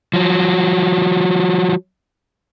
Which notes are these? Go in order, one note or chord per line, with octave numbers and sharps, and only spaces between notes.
F3 F#3